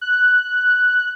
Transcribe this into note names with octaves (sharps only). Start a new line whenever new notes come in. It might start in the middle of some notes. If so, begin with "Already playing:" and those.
F#6